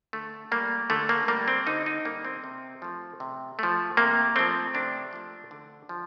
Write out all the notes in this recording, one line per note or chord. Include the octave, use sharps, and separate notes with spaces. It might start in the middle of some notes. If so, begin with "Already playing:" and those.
D3 A3
G3 A#3
D3 A3
A#3
G3 A#3
C4
D3 D#4
D#4
G3 A#3
C4
C3
F3 A3
C3
F3 A3
C3 A#3
F3 A3 C4
C3 D4
F3 A3
D3
F3